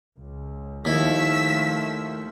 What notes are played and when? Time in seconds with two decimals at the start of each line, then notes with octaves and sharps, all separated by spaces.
0.17 C#2
0.85 D#2 D#3 F3 A3 E4 E6 B6